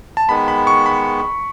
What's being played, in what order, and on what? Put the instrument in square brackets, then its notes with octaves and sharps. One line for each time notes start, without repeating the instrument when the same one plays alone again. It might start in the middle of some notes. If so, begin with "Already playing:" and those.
[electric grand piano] A5
[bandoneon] D#3 G#3 B3 [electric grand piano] B5
[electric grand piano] B5
C#6
B5